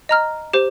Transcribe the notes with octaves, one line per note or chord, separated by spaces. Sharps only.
D#5 A#5 F6
G4 C5